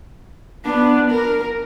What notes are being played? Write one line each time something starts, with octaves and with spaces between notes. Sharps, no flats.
B3 D4
A#4